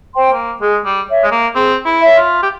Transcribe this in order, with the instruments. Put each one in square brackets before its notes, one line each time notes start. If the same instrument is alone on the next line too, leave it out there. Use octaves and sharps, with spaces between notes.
[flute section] C5 G5 C6
[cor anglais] A#3
[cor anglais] G#3 [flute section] G#4
[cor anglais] G3
[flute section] C#5 E5
[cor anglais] G#3
A#3
[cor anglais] C4 [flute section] G#4
[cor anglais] E4
[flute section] C#5 E5
[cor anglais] F4
G4